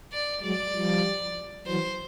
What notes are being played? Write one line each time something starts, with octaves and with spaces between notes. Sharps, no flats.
D5
F#3 G#3 D5
F3 G3
E3 F#3 C5